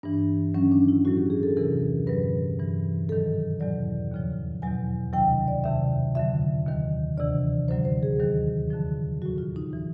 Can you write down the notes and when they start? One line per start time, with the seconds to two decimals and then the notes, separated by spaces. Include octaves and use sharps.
0.03 G2 E3 D4
0.54 G2 D#3 F#3 C#4
0.72 D4
0.89 E4
1.05 A2 F#3 F#4
1.17 G4
1.30 G#4
1.43 A4
1.57 E2 C3 E3 A#4
2.07 G2 D3 F#3 B4
2.59 G2 E3
3.09 G#2 D#3 F#3 A4
3.60 E2 B2 F#3 D5
4.12 D#2 C#3 F3
4.62 E2 B2 F#3 G#5
5.13 D2 C3 D#3 F#3 G5
5.48 D5
5.64 F2 C3 D#3 E5
6.15 F2 D3 F#3 E5
6.67 D#2 D#3 F#3
7.18 D2 C3 E3 D5
7.68 F#2 D3 F#3 C5
7.85 C5
8.03 G#4
8.20 D#2 D#3 F#3
8.70 F2 D3 F3
9.22 A2 F#3 F#4
9.38 F4
9.56 D#4
9.73 E3